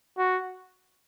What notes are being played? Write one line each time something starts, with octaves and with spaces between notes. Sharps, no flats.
F#4